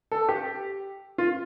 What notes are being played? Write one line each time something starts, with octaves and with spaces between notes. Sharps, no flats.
A4
G4
F4